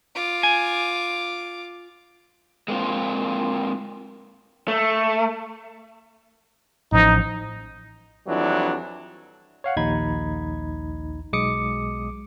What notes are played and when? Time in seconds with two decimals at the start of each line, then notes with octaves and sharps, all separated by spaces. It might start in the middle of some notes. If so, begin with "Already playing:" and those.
0.15 F4 D6
0.43 G#5
2.68 G#3 A#3 C4 F4
4.68 A3
6.92 A1 F3 D#4
8.27 F2 E3 F#3 G3 D4
9.64 C#5 F5 F#5
9.77 A#1 D#2 D#4 B5 G#6
11.33 B1 G#3 D6 D#6 C#7